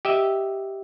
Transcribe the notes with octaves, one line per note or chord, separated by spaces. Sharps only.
G4 D#5 E5